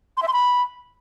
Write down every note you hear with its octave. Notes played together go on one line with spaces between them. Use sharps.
C6
E5
C6
B5